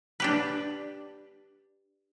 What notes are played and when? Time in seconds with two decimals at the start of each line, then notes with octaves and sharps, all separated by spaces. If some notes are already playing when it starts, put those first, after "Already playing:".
0.20 D4 G4 B4